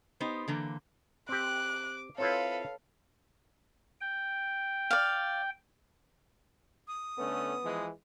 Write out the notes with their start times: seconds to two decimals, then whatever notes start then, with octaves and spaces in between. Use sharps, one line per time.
0.20 B3 D#4 G4 C5
0.48 D3 E3 A#3
1.29 C4 G4 D6 F#6
2.18 C4 E4 F4 A4 B4 C#5 F5
4.01 G5
4.91 D5 F5
6.88 D#6
7.18 D3 A3 B3 C#4
7.64 E3 F3 G#3